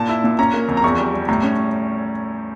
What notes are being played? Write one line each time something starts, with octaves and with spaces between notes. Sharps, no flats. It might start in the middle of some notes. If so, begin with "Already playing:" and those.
Already playing: A#2 A5
E4
A#2
C#4 A#5
A#3
F2
A#5
E2 C#6
G3
G3
A2 A#5
C#4